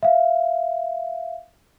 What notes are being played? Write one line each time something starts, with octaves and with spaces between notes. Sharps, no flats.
E5 F5